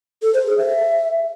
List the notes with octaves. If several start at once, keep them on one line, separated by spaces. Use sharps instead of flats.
A4
C5
G#4
E5